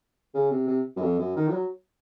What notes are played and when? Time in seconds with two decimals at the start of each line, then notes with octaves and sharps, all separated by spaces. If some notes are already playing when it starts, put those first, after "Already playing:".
0.34 C#3
0.51 C3
0.67 C3
0.96 F#2
1.02 F2
1.19 F#2
1.36 D#3
1.48 F3
1.53 F#3